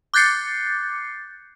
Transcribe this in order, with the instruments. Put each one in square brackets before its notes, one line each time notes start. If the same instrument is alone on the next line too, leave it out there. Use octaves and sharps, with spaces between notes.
[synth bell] D6 F#6 G6 A6 C7 C#7